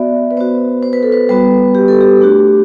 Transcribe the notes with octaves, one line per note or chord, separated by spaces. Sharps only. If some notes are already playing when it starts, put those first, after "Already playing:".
Already playing: B3 F#4 D5 E5
B4
B3 F#4 C5
C5
B4
A4
B4
G3 B3 F#4 B4
G4
A4
G4
A3 D4 F#4